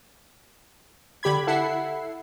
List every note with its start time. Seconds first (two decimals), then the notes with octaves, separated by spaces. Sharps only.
1.23 D3 G4 B5 G#6
1.47 E4 A4 E5 F#5 C7